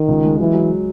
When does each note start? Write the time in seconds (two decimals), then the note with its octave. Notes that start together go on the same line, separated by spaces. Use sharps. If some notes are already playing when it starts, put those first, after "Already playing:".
Already playing: D#3
0.08 C#2
0.24 G#3
0.39 E3 F#3
0.54 F#3